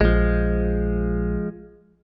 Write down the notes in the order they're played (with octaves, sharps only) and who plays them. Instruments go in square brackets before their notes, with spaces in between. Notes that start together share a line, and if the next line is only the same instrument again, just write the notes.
[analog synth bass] A#1 [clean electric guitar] F3 G#3